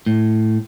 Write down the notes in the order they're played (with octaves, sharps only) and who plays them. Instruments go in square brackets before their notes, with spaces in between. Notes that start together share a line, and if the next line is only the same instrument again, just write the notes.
[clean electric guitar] A2